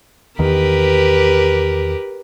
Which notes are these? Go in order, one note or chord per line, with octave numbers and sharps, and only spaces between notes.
E2 D#3 G4 A#4 B4